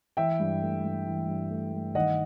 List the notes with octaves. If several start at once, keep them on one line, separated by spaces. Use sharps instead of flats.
E3 E5 G5
G2
A3
G2
E3
G2
A3
G2
D#3 D#5 F#5